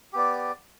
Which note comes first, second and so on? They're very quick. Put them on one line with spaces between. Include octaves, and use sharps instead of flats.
G4 B3 D5